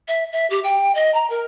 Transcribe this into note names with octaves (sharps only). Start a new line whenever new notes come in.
E5
E5
G4
G5
D#5
A#5
A#4